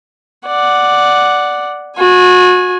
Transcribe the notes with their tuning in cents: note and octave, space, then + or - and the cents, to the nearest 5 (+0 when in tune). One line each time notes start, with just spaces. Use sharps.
D5 +0 F#5 +0
F#4 -30 G#5 +0